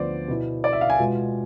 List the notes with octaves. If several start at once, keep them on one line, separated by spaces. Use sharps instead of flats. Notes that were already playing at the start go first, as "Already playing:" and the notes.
Already playing: D2 D3 F3 B3 C5 D5
B2 B3 E4
D5
E5
F5
G#5
B2 G#3 B3 F4